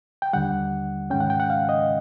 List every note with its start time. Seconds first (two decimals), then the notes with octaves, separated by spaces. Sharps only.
0.22 G5
0.33 D#2 D3 G3 F#5
1.10 G#2 D#3 G#3 C#4 G5
1.20 F#5
1.30 G5
1.40 F#5
1.50 F5
1.69 D#5